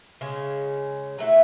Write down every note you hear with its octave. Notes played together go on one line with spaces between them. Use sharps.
C#3 G#3 C#4
F#3 A3 E4 A4